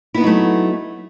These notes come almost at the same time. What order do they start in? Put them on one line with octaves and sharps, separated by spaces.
E4 B3 D#4 F#3 A3